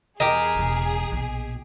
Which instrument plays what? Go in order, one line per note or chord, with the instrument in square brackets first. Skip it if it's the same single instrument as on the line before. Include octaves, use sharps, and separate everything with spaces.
[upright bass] E2 [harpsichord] G4 D#5 [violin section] G#4 [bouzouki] A#4
[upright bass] E1 C#3
A#1 B2